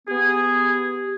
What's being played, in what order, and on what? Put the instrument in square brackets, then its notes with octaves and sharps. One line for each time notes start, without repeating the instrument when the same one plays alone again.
[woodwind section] B3 G#4 [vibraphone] G4